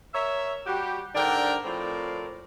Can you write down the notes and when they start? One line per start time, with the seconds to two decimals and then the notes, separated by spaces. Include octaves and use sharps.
0.14 A#4 C#5 E5
0.67 G3 F#4 G4
1.15 G#2 D3 D4 A#4 G5
1.64 A2 F3 C4 A#4 D5